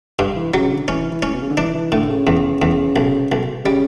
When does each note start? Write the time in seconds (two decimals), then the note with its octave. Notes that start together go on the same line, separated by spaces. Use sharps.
0.19 G2
0.36 E3
0.54 C#3 F#3
0.71 D3
0.88 E3 C#4
1.11 E3
1.22 A2 C#4
1.35 B2
1.42 C#3
1.50 D3
1.57 E3 D4
1.75 E3
1.92 A2 D3
2.10 C#3
2.27 E2
2.62 E2
2.96 B1
3.32 B1
3.66 C#3 G3